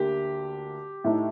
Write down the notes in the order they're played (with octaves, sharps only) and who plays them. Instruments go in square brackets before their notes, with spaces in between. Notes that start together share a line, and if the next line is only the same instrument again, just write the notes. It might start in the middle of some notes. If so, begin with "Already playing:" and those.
Already playing: [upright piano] D2 D3 A#3 [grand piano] G4
[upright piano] A2 A3 D#4